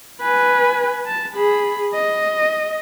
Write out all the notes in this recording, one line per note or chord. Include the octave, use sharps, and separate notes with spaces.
B4 G#5
A5
G#4 B5
D#5